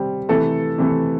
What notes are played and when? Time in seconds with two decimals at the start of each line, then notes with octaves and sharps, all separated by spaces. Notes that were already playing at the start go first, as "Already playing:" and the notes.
Already playing: C3 G3 C4
0.29 C3 E3 A3 A4
0.78 C3 E3 A3